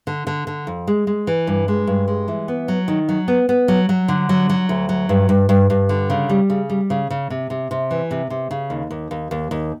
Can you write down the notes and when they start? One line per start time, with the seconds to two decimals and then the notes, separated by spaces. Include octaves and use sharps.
0.07 D3
0.27 D3
0.47 D3
0.67 F2
0.87 G#3
1.07 G#3
1.27 E3
1.47 G2
1.68 G#3
1.87 G2
2.08 G#3
2.28 E3
2.48 B3
2.68 F#3
2.88 D#3
3.09 F#3
3.28 B3
3.49 B3
3.68 F#3
3.89 F#3
4.08 D3
4.29 F#3
4.49 F#3
4.69 D2
4.89 F#3
5.09 G2
5.29 G2
5.49 G2
5.70 G2
5.89 D3
6.10 C#3
6.30 G3
6.50 C#3
6.70 G3
6.90 C#3
7.10 C#3
7.30 C3
7.50 C3
7.71 C3
7.91 E3
8.11 C3
8.30 C3
8.51 C#3
8.70 D#2
8.91 D#2
9.11 D#2
9.31 D#2
9.51 D#2